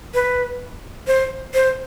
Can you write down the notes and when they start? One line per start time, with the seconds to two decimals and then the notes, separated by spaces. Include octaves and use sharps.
0.14 B4
1.07 C5
1.54 C5